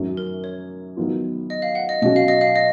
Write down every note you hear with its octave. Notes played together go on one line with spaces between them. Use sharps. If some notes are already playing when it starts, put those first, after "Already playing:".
Already playing: F#2 D#3 F#3
A#4
C#5
D#3 F#3 B3 F4
D#5
F5
F#5
D#5
B2 F#3 C#4 F#4 D#5
F5
D#5
F5
D#5